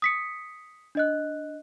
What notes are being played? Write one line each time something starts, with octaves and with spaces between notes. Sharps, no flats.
D#6 B6 C#7
D4 D#5 F#6